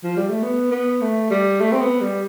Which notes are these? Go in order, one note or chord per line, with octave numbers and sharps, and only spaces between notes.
F3
G3
A3
B3
B3
A3
G3
A3
C4
B3
G3